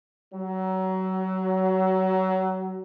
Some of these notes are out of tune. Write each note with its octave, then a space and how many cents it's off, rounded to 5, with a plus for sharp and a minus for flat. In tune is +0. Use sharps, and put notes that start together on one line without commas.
F#3 +25